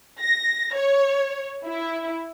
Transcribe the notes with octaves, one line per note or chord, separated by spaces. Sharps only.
A#6
C#5
E4